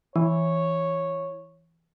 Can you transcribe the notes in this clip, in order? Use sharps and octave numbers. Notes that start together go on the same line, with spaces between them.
E3 C#5